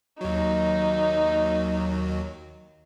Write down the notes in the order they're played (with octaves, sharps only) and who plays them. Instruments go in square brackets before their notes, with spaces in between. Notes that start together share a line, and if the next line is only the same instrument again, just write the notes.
[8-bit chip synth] D#2 F#3 [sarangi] D#4